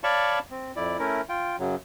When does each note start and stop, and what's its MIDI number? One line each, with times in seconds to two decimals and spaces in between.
0.04 0.39 73
0.04 0.39 74
0.04 0.39 77
0.04 0.39 81
0.04 0.39 83
0.04 0.39 85
0.51 0.72 60
0.76 0.97 41
0.76 0.97 64
0.76 0.97 74
0.99 1.21 57
0.99 1.21 61
0.99 1.21 64
0.99 1.21 70
1.29 1.56 65
1.29 1.56 79
1.59 1.75 42
1.59 1.75 49
1.59 1.75 54